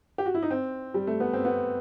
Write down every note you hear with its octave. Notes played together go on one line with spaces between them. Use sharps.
G4
F#4
E4
D#4
C4
G3
A3
B3
C4
B3